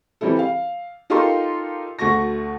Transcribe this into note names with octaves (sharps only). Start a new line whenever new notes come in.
E3 G3 C4 E4 A4
F5
D#4 F4 G4 A4 A#4 C6
D2 A3 F#4 C#6 A#6